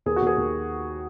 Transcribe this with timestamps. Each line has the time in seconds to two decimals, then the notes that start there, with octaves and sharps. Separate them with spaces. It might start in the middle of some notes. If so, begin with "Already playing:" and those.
0.06 D#2 G#4
0.16 F#4
0.22 D#2 G#4
0.38 D#2